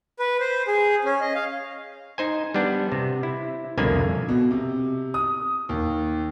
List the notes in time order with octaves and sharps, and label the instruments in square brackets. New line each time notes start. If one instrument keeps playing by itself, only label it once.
[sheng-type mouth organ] B4
C5
G#4
C#4
D#5
F5
[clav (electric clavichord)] D#4 C5 G#5
G3 B3 D4
C3
E4
C2 F2 B2 D3 A#3 G#5
[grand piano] B2
C3
D#6
D#2